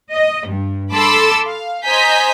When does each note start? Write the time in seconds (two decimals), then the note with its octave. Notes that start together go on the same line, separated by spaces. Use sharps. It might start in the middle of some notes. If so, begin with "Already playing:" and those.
0.12 D#5
0.47 G2
0.93 A4 A5 B5 C6 D6 E6
1.46 F5
1.85 C5 D#5 G#5 A#5 G6 B6